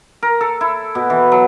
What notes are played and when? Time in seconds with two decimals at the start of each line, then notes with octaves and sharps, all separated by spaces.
0.23 A#4
0.41 A4
0.61 E4
0.95 B2
1.10 E3
1.32 F#3